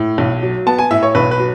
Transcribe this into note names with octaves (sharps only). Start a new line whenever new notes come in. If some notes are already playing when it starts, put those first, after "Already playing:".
Already playing: A2
B1
F#3
B3 A5
G#5
A2 E5
C#5
B1 B4
B4
F#3